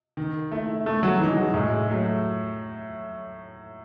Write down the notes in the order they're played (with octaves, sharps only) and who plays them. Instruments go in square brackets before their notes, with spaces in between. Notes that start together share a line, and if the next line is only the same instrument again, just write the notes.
[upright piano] D#3
A3 E4
[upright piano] C#3 [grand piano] A3
[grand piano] F#3
[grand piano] E3 [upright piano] G#3 D#4
[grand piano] F#3
[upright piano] A2 [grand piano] G#3
[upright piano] F#3 A3